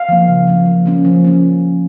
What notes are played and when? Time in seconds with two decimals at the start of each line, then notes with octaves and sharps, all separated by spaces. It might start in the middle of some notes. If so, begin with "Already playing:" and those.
Already playing: F5
0.09 F3 A#3
0.28 C#3
0.47 F3 A#3
0.66 F3
0.86 A#3 C#4
1.05 F3
1.25 A#3 C#4